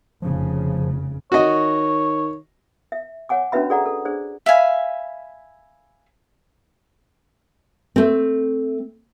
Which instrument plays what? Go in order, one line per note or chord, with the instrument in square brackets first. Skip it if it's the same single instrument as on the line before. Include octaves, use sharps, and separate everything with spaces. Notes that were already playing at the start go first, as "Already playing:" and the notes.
[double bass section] F1 C#3 [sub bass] F3
[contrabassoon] D#3 [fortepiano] F#4 D#5 [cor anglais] C#5
[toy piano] E5
C#5 F#5 G#5 D6
C#4 D4 F#4 B4 E5 B5
G#4 A4 D5 F#5 A#5
A4
D4 G#4 C5 D5
[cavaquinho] E5 F5 G#5 B5
[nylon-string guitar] A3 C4